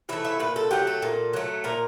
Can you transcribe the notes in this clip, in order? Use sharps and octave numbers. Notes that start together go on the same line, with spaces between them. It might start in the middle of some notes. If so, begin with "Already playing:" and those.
E3 A3 E5
E5
A#2 B4
A4
F#3 A3 G4
A4
A#2
F#3 A3
A#2 A#4